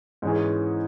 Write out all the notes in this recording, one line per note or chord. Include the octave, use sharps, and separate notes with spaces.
G#2 E3 C#4 G#4